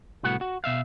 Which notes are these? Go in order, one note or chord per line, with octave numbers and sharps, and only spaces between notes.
C2 A2 B3 F#4 F#5
F#4
B2 E5 F5